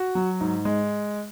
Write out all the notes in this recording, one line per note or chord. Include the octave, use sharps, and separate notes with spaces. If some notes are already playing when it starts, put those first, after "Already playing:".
Already playing: F#4
F#3
G#2
G#3